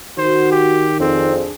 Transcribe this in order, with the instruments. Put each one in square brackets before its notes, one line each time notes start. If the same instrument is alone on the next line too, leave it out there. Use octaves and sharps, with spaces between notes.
[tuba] D#3 [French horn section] F#4 [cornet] C5
[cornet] G4
[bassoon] F2 [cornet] C4 [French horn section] D4 G#4